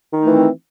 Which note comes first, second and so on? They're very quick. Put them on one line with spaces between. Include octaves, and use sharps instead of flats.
D#3 D#4 A3 E3 C4